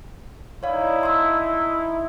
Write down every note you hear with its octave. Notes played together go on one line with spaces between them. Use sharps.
D#4 E4 C#5 D5 F5
A5 C6 E6